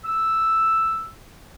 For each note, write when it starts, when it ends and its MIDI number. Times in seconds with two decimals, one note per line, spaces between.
0.05 1.09 88